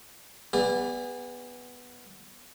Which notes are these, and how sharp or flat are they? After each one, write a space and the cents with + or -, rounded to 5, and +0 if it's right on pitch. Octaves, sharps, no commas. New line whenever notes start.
B3 +0 G#4 -35 D5 +0